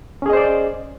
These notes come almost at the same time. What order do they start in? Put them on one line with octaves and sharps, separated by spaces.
C#4 G#4 D#5 C5 D5